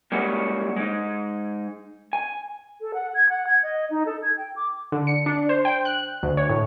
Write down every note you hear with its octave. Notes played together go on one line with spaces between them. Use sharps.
G3 G#3 A#3 C#4 E4 F#4
G#3 D#4
G#5
A4
F#5
G#6
F#5
G#6
D#5
D#4
A4
G#6
G5
D6
D3
C#7
D4
C5
G5
F#6
D2
C#5
A2